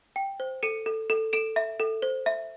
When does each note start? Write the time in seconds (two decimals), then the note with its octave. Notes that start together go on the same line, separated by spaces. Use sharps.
0.16 G5
0.40 C5
0.63 A4 C#7 D#7
0.86 A4
1.10 A4
1.33 A4 D7 E7
1.56 E5
1.80 A4
2.02 C5
2.26 E5